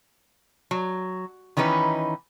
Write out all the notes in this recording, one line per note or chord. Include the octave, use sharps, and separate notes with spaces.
F#3
D#3 E3 C#4 D#4 B4